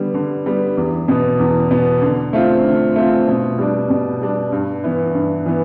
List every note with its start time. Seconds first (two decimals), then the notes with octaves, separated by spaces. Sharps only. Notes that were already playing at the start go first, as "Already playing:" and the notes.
Already playing: D3 G3 B3
0.14 D3
0.46 G3 B3
0.77 E2
1.08 B2 B3
1.39 E2
1.71 B2 B3
2.02 D3
2.33 A3 C4 F4
2.64 D3
2.96 A3 C4 F4
3.28 B2
3.58 G3 D4
3.90 B2
4.21 G3 D4
4.52 G2
4.83 E3 B3 E4
5.15 G2
5.46 E3 B3